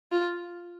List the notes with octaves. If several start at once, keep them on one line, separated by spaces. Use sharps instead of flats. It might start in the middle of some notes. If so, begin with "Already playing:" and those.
F4